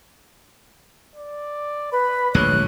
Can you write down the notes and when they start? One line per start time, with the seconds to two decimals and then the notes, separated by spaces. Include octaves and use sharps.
1.16 D5
1.92 B4 B5
2.34 D1 A#1 G#3 C#5 F#6